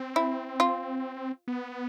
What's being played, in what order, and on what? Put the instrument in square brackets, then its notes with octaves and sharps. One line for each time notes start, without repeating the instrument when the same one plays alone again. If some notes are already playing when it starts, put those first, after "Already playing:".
Already playing: [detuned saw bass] C4
[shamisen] E4
F4
[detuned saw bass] B3